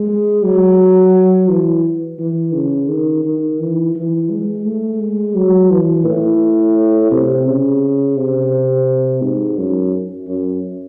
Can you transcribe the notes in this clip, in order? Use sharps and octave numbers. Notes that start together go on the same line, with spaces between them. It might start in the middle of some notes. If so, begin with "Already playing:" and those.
Already playing: G#3
F#3
E3
E3
C#3
D#3
D#3
E3
E3
G#3
A3
G#3
F#3
E3
A2
C3
C#3
C3
G#2
F#2
F#2